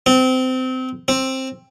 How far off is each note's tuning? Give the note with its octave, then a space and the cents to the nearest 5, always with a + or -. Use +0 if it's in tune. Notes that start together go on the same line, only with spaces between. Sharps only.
C4 -25
C4 +10